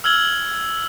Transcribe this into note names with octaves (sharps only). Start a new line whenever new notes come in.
E6 F6 G#6 F#7 G7